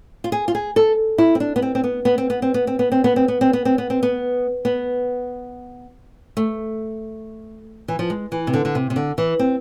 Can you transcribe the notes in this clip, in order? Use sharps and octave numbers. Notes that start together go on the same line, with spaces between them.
F4
G#4
F4
G#4
A4
E4
C4
D4
B3
C4
C4
B3
B3
C4
B3
C4
B3
C4
B3
C4
B3
C4
B3
C4
B3
C4
B3
C4
B3
B3
A3
E3
F3
G#3
E3
C3
D3
D3
C3
C3
D3
E3
C4